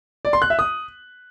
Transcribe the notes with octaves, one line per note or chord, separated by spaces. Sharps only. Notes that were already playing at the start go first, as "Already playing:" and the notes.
D5
C6
F#6
E5
D#6